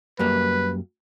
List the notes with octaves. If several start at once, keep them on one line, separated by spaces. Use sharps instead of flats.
F#2 G3 A#3 B4